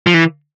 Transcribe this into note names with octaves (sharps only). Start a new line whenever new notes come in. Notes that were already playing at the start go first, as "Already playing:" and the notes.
F3
E3